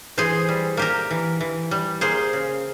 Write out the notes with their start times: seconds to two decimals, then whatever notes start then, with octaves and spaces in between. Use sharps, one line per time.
0.18 E3 G#4 C5
0.49 G3
0.77 A#3 G4 A#4
1.11 E3
1.41 E3
1.71 G3
2.01 A#3 G#4 C5
2.33 C#3